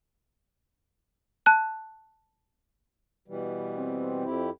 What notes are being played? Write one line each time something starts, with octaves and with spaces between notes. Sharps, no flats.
A5 F#6
B2 E3 G3
C4
F2 E4 G4